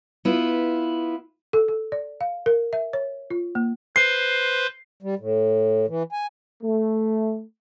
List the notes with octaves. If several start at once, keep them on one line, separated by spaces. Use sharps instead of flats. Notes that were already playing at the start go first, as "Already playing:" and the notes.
B3 E4 F4
A4
A4
D5
F5
A#4
E5
C#5
F4
A#3
B4 C5 C6 C7
G3
A2
E3
G#5
A3